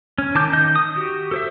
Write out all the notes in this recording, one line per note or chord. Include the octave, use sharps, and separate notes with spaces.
C#4
D#3 A5 D6 G6
D#3 D#5 G6
D#6
F#4 G4
A4 C5 E5